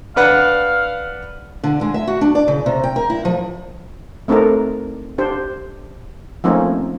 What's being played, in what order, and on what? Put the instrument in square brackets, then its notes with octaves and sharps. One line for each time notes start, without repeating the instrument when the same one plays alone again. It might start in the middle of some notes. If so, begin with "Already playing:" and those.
[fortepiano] D4 B4 F#5 [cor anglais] F5
[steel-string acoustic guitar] D3
G#3
E5
F#4
D4
D5
C#3
C3
G5
A#4
E4
F3
[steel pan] A3 C4 D4 D#4 A4 A#4
D4 G4 C5
F3 A3 A#3 C4 C#4 D#4